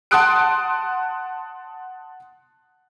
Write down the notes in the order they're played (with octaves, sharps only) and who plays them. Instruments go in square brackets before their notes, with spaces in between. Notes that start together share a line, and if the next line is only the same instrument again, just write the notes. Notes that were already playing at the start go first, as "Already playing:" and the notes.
[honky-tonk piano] F#5 A5 C6 D#6 F#6 D7